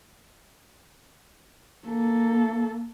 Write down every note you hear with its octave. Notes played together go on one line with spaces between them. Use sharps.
A#3 A4